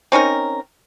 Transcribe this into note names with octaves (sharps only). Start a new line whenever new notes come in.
C4 C#4 D#4 A#4